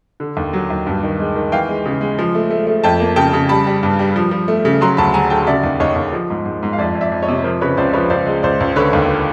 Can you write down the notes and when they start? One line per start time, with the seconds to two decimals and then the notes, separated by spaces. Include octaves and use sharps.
0.20 D3
0.37 D#2
0.53 F#3
0.70 D#2
0.87 G2
1.03 D#3
1.20 G#3
1.36 D#3
1.52 E3 F5 G5
1.69 G#3
1.86 C#3
2.01 G#3
2.19 F3
2.35 A3
2.50 A3
2.67 A3
2.84 F2 G5 A5
3.00 A#3
3.16 C#3 G5 A5
3.33 C#3
3.49 G3 A5 B5
3.66 G3
3.83 G2
3.99 G3
4.16 F3
4.31 F3
4.48 A3
4.65 C#3
4.81 F#3 A#5 C6
4.97 D2 A5 B5
5.14 F#3 G#5 A#5
5.30 D3 G5 A5
5.47 C#3 D5 E5
5.64 D#2
5.80 D#2 C#5 D#5
5.96 D#2
6.13 F3
6.30 G#2
6.46 G#2
6.63 G#2
6.73 F5
6.78 F2 D5 E5
6.95 F2
7.01 D5 E5
7.12 F2
7.22 C#5 D#5
7.28 C3
7.44 F3 A#4 C5
7.61 C#3 B4 C#5
7.77 C#2 C5 D5
7.93 F3 B4 C#5
8.10 C#2 C5 D5
8.26 G#3
8.43 C#2 C5 D5
8.60 C#2
8.76 D3 B4 C#5
8.93 D#2